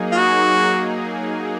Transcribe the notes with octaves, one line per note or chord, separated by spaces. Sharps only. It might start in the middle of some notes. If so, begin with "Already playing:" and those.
Already playing: F#3 A#3 D#4 G#4
F4
F#4